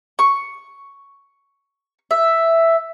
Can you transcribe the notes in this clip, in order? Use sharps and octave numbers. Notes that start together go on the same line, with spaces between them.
C#6
E5